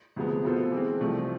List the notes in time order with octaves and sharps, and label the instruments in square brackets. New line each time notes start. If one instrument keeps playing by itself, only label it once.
[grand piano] D2 C3 F3 G#3 B3
B2 B3 F4 A4 C5
E3 G#3 C4
C2 C3 F3 A3